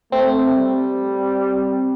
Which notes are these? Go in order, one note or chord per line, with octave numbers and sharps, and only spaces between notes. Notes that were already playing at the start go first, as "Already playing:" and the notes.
A3 C4
G3